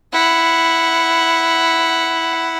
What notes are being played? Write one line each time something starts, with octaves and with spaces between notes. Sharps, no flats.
E4 F#5